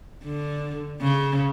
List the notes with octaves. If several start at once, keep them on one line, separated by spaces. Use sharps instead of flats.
D3
C#3